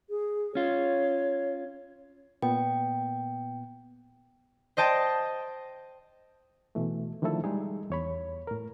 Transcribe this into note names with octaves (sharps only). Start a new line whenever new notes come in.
G#4
C#4 F4 C#5
A#2 B3 G5
C5 D#5 G5 A5
B2 E3 A3
D3 D#3 F3 A3 E4 A4
G3 G#3 D#4 G#4
E2 C#5 B5
A2 A#4